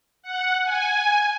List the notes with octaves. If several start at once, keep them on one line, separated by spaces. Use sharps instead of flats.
F#5
G#5